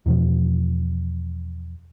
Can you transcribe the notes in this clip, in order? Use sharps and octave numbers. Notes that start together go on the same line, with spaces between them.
E2 B2 F3